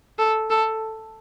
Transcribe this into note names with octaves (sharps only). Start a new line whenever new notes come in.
A4
A4